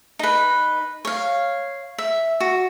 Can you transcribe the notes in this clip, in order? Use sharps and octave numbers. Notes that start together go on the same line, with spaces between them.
D#4 B4
C#5 F5
E5
F#4